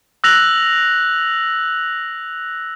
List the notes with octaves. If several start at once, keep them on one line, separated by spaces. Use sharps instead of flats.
E6 F#6 A#6 F7 F#7